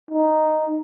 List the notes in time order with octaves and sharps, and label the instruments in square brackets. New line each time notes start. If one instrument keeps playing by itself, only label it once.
[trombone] D#4